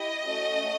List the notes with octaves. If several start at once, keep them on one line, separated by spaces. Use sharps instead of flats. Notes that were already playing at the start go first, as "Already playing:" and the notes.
Already playing: E4 G4 D#5
A3 C#4 F#4